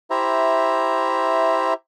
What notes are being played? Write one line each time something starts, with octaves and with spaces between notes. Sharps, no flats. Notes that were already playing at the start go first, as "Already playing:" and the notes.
E4 G4 C5 E5 A#5